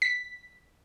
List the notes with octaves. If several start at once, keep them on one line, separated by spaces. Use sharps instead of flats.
B6